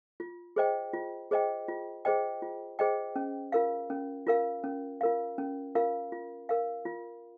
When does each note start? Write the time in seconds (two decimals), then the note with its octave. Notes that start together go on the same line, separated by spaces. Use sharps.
0.20 F4
0.56 G#4 C5 D#5 G5
0.93 F4
1.31 G#4 C5 D#5 G5
1.68 F4
2.05 G#4 C5 D#5 G5
2.42 F4
2.79 G#4 C5 D#5 G5
3.16 C#4
3.52 F4 A#4 F5
3.90 C#4
4.27 F4 A#4 F5
4.64 C#4
5.01 F4 A#4 F5
5.38 C#4
5.75 F4 A#4 F5
6.12 F4
6.49 A#4 F5
6.86 F4